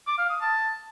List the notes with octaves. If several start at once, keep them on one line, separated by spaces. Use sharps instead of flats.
D6
F5
D#6
A5